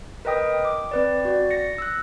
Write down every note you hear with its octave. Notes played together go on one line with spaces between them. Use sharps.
A#4 B4 D#5 G5 D#6
D6
C4 B4 D5
F#4 D5
A#6 C#7
E6 F#6